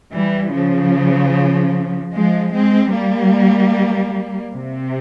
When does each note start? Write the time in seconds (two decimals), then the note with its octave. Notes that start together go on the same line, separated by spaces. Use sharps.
0.13 E3 G3
0.53 C#3 F3
2.14 F3 G#3
2.54 G#3 C4
2.94 G3 A#3
4.55 C3